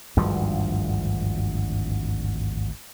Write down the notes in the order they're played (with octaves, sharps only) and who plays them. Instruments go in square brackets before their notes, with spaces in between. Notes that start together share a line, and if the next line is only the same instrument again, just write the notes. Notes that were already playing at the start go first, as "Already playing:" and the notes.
[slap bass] G#1 D2 G2 F3